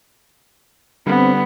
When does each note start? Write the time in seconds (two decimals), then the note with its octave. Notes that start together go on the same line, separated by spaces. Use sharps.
1.06 D3 G3 B3 C4